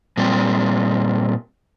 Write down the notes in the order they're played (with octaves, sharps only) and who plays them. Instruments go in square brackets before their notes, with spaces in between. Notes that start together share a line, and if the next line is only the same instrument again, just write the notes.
[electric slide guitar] A#2 G3 C4